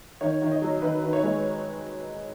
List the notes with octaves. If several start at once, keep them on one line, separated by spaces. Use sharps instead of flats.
D#3 C#5
D#3
D#5
F#3
D#3 B4
D#3
C#5
G#3